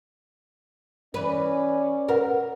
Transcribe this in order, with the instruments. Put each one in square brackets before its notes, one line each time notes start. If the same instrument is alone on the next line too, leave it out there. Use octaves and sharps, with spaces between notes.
[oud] E3 B4 [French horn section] C#4 D5
[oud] A#4 [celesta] B4 F#5